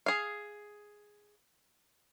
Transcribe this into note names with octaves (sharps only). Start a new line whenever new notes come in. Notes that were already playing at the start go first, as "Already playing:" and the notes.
G#4 F5